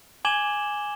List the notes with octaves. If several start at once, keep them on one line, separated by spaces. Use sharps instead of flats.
G#5 D6 G#6 E7 F#7 G7